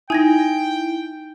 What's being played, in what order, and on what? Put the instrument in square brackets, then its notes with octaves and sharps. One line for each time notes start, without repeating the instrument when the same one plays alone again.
[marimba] D#4 [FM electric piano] E4 [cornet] G5 [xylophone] G#5 G#6 A#6